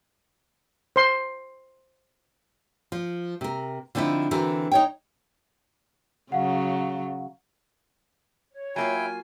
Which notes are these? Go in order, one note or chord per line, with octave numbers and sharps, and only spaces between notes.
C5 C6
F3
C3 A#4
D3 F3 C4 D#4 E4
D3 E3 C4 F#4 A#4
D#4 C#5 G5
C#3 F#3 F5 F#5
C#5
F#3 A#3 E4 F4 G5 G#5